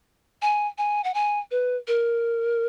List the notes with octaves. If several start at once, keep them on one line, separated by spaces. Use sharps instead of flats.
G#5
G#5
F#5
G#5
B4
A#4